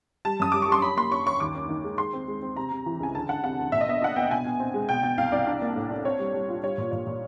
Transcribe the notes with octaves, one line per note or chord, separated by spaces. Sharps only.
G3 A5
F#2 D#6
G3 D6
C#6
G3 C6
C#4 B5
A#3 C6
C#4 C#6
C#4 C#6
D#2 D6
C#4
D#3
G#3
G#3 C6
C4
G#3
C4
C3 A#5
C3
E3
C#2 G#5
D2 A5
D2 F#5
C3 F#5
D2
A#2 E5
D#5
B3 E5
D4 F#5
B3 G5
B2 G#5
B2
C4
G#3
B2 G5
B2
C2 F5
C2 D5
D4
A#3
A2
D4
C4 C#5
G3
G3
F4
G3 C#5
A#2
A#2 C#5
A#2